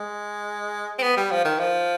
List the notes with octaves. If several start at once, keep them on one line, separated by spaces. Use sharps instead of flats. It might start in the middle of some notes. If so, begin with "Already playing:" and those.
Already playing: G#3
C4
B3
G3
F3
D#3
F3